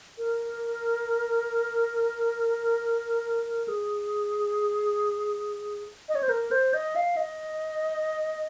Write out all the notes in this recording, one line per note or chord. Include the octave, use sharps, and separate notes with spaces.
A#4
G#4
D#5
C#5
C5
A#4
C5
D#5
F5
D#5